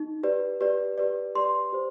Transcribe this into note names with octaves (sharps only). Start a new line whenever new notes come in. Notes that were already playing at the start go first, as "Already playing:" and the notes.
Already playing: D#4
G4 B4 D5
G4 B4 D5
G4 B4 D5
G4 B4 D5 C6
G4 C5